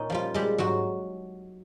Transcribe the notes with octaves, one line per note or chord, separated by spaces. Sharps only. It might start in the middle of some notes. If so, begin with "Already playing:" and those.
Already playing: A#2 C#4 D#4
F3 G3 F4
G3 G#3 G4
G#2 F#3 F#4